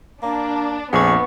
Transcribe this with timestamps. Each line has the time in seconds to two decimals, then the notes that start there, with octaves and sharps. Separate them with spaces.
0.22 A#3 D4
0.93 A#1 F2 B3 G#4 F#5 C#6